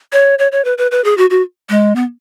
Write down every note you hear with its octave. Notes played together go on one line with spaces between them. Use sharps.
C#5
C#5
C#5
B4
B4
B4
G#4
F#4
F#4
G#3
B3